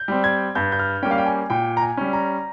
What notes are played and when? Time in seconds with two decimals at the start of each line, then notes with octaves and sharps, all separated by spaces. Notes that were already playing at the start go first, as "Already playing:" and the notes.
Already playing: G6
0.08 G3 C4
0.24 G#6
0.55 G2 G6
0.72 G6
0.79 F6
1.03 G3 A#3 C#4 G5
1.11 F5
1.18 G5
1.26 G#5
1.50 A#2 G5
1.77 A#5
1.82 G#5
1.97 G3 C#4
2.13 A#5